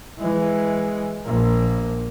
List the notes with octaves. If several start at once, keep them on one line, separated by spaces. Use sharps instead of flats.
E3 G#3
A#1 A#3